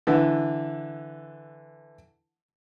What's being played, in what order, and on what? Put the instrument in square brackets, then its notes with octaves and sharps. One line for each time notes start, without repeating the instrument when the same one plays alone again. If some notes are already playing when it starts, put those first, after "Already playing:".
[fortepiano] D3 E3